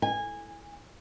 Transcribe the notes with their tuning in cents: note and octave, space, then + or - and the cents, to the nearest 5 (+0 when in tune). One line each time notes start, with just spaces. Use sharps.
G#5 -15